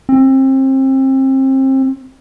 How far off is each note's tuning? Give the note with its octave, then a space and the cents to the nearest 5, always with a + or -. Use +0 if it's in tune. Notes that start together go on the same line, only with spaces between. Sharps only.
C4 +30